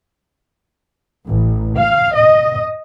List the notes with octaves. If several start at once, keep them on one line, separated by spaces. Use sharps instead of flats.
A1
F5
D#5